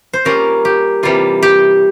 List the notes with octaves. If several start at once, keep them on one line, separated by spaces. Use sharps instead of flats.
C5
G3 A#3 C#4 F4 A#4
G4
C3 E3 G3 A#3 F4
G4